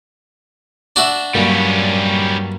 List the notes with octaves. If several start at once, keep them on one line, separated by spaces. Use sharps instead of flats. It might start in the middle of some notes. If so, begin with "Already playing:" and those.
D4 F#4 E5
G2 F#3 G3 A#3 C#4